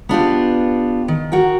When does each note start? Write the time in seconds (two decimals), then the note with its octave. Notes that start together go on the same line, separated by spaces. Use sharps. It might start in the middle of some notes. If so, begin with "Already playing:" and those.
0.09 B3 D4 F4 G4
1.08 D#3
1.32 F#4 A#4 G5